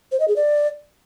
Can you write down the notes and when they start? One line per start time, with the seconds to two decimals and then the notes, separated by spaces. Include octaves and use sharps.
0.12 C5
0.20 D#5
0.28 G#4
0.36 D5